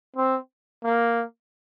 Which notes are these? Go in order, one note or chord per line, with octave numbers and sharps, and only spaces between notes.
C4
A#3